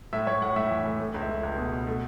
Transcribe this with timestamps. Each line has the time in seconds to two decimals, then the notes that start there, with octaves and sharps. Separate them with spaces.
0.13 A2 E5
0.27 A2 C#5
0.42 A2 F#5
0.56 A2 E5
0.71 E3
0.85 A2
1.00 A3
1.14 C#2
1.22 E5
1.29 A3
1.43 C#2
1.58 B2
1.72 B2
1.87 A3